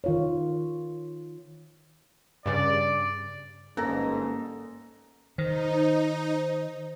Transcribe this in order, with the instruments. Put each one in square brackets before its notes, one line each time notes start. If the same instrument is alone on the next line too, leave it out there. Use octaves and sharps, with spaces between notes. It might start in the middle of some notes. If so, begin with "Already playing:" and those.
[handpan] D#3 F4 C#5
[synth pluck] G2 C#3 [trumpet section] D5
[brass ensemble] G1 G#2 [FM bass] A#3 [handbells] C#4 A#6 [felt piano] A4 A#5
[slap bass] D#3 [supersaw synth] D#4 [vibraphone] C5